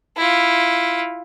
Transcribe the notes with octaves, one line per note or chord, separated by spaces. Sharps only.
E4 F4